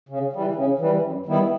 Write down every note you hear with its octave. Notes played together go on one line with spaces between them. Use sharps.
C#3
E3 G3
C#3
E3 G3
F#2
D#3 G3 B3 E4